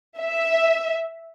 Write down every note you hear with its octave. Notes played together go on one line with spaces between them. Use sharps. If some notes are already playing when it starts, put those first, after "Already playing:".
E5